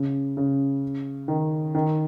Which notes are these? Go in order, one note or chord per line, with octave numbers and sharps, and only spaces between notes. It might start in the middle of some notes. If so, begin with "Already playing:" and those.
Already playing: C#3
C#3
D#3
D#3